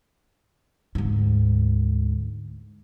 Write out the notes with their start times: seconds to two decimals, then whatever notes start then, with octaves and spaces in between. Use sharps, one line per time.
0.95 D2 G#2